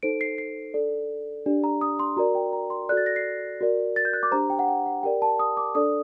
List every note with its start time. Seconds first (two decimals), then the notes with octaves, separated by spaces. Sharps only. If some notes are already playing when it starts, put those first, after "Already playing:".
0.03 D#4 A4 C5 D7
0.21 C7
0.38 C7
0.74 D4 A4 D5
1.46 D4 G4 D5
1.64 A#5
1.81 D#6
1.99 C6
2.17 F#4 A#4 D5 A#5
2.35 G5
2.53 A#5
2.70 C6
2.89 F#4 A4 D5 F#6
2.97 A6
3.06 A#6
3.16 C7
3.61 F#4 A#4 D5
3.96 A6
4.05 G6
4.13 F#6
4.23 D6
4.31 D4 G4 C5 A#5
4.50 G5
4.59 F#5
4.68 G5
4.86 F#5
5.03 G4 A#4 D5 G5
5.22 A5
5.39 D#6
5.57 D6
5.75 D4 A4 D5 D#6